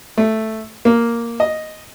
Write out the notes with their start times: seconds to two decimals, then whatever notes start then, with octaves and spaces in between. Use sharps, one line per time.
0.18 A3
0.85 A#3
1.40 D#5